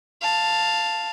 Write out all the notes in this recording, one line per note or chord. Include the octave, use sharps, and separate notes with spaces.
F5 A5